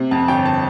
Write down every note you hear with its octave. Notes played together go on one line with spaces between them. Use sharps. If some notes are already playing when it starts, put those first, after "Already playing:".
Already playing: C3
F2 A5
G1 G5
A5